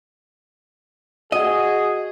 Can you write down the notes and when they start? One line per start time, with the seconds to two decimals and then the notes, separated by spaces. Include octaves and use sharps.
1.32 F#4 G#4 D#5